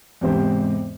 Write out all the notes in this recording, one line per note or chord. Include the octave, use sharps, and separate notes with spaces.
E2 G#2 C3 C4 G4 C5